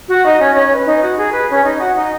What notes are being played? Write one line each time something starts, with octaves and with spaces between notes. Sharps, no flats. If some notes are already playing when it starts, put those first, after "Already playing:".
F#4 F#5
D#4 D#5
C#4 C#5
C#4 C#5
B4
D#4
F#4
G#4
B4
C#4 C#5
D#4 D#5
F#4 F#5
D#4 D#5